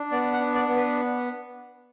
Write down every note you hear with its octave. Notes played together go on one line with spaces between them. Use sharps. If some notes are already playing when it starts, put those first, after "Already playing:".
Already playing: D4
B3 D5
F#5
D4
D5
B3
B4